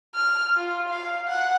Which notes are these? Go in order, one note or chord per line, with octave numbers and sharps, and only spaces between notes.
F6
F4
F5
F#5